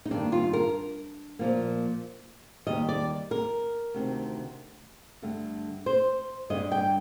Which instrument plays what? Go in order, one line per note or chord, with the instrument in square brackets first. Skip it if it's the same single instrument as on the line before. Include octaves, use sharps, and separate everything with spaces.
[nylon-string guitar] D#4
G2 D#3 A#3 D4
F4
A#4
A#2 F3 A#3
D#2 D#3 G3 D#5
D5
A#4
D2 C3 D#3
G2 D3 A3
C5
G2 D3 G3 D#5
G5